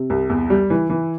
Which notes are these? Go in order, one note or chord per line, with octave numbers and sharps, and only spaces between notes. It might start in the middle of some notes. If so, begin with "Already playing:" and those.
Already playing: C3
C2
E2
G3
E3
E3